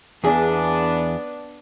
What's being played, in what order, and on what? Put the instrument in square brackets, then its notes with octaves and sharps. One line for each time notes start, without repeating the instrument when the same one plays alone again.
[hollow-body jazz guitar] E2 G#4 [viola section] B3 D4